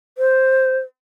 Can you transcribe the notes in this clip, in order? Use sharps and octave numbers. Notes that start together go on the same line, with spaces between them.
C5